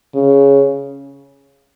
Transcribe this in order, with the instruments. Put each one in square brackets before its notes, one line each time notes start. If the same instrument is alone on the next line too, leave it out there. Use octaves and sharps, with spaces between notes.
[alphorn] C#3